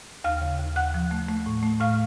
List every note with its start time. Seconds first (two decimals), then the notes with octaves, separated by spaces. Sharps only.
0.24 D#2 F5 F6
0.42 C#3
0.59 D#2
0.76 D#2 F#5 F#6
0.94 F3
1.11 A3
1.28 A3
1.46 A2
1.63 A3
1.80 A2 F5 F6